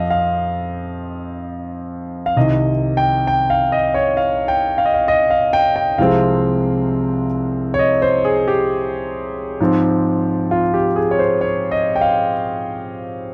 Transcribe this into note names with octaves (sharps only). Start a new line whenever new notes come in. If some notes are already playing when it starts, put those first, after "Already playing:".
Already playing: F2 F3 D#5 F5
F5
F5
C2 C3 D#3 D#5
G5
G5
F5
D#5
C#5
F5
G5
F5
D#5
F5
D#5
F5
G5
G5
C2 C3 F3 G#3 C4 F5
C#5
D#5
C5
G#4
G4
G#2 F3 C4
F4
G4
G#4
C#5
C5
C#5
D#5
G5
F5